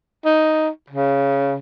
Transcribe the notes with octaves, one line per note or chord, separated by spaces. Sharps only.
D#4
C#3